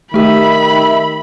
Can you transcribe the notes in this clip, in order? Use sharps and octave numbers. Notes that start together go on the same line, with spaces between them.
D#3 A3 G4 E5 B5